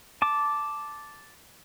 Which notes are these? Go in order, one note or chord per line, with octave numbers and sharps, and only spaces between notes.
A5 D6